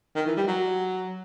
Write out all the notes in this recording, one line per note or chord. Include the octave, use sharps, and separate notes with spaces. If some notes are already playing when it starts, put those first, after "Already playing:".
D#3
E3
G3
F#3